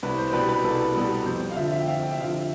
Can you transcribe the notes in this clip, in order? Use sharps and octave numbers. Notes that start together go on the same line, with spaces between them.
C2 B4
C5
B2 G3 B3 B4
B4
C2 A4
B2 G3 B3
F2 C5
F5
D3 F3 E5
E5
G5
F2 F5
G5
E5
D3 F3 F5
E5